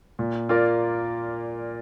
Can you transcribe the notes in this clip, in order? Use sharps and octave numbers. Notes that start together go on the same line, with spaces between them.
A#2
A#3 F4 A#4 D5